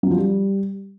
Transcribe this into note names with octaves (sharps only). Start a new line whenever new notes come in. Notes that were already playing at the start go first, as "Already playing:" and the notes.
F#3
F3
G3